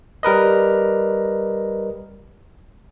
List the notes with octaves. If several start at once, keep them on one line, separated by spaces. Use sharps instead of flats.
G3 A#4 B4 D#5